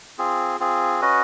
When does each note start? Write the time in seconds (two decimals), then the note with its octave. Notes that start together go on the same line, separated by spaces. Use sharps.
0.18 C4 F4 G#4
0.60 C4 F4 G#4
1.01 C#4 F#4 B4 D#5